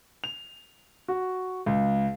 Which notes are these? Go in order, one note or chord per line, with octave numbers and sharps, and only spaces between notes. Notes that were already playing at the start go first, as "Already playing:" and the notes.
F7
F#4
C#2